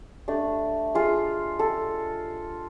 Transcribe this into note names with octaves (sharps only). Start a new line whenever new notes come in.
A3 D4
F4 G#4
A4